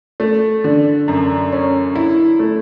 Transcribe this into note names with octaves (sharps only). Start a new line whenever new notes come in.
A3
D3
F#2
C#4
E4
A3